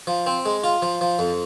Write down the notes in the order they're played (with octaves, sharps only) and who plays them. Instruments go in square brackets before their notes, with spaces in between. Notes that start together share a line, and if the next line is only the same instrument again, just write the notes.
[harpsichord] F3
C4
G#3
F4
F3
F3
F2